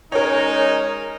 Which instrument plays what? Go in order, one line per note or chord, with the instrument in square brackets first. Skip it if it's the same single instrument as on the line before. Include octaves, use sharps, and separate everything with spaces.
[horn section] G#3 C#4 D#4 [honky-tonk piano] A#4 C#5